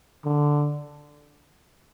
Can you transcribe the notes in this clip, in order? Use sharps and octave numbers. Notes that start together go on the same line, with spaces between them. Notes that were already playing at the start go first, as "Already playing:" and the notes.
D3